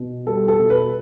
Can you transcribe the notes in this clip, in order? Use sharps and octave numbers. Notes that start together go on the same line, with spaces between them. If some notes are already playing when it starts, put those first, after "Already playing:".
Already playing: B2
G3 A4
A4
B2
B4